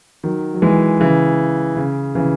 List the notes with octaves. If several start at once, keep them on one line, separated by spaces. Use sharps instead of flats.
D#3 F#3
F#3
E3 G#3
C#3 E3
C#3
C#3 E3